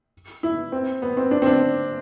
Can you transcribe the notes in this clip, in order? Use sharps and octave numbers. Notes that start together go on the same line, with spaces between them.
E4
C4
B3
C4
D4
C4
D4